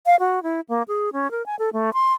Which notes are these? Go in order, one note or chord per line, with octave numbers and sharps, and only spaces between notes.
F5
F#4
E4
A#3
G#4
C#4
A#4
G#5
A4
A3
C6